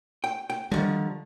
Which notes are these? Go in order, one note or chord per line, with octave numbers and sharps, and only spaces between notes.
G5
G5
D3 D#3 F3 G3